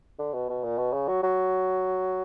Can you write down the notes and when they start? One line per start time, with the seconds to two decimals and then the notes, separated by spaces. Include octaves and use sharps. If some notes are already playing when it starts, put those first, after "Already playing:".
0.19 D3
0.34 B2
0.49 B2
0.63 A#2
0.78 B2
0.93 C#3
1.08 F#3
1.23 F#3